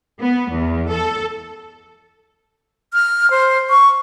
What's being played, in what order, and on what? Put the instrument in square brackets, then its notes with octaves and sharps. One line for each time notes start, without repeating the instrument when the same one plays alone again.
[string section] B3
E2
A4
[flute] F6
C5
C#6